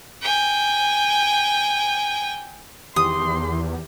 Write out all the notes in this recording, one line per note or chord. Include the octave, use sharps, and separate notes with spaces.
G5 G#5
E2 D#3 G4 C6 D#6